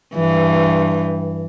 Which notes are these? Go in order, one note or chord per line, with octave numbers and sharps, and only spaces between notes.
G2 E3